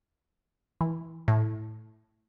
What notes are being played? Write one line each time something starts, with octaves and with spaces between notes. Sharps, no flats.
E3
A2